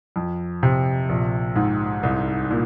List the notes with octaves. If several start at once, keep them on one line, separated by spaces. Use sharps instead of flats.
F2
C3
A#1
G#2
C2
A#2